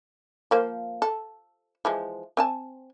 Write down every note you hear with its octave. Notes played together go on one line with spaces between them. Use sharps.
F3 A#3 C5
A4
E3 F3 G#3
C4 G#5 A5